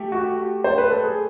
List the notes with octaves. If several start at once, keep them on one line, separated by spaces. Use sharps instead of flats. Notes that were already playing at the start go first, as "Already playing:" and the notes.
Already playing: A3 G4
F#4
C5
B4
A4
G#4